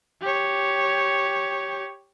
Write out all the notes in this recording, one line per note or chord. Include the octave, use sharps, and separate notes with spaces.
G4 C#5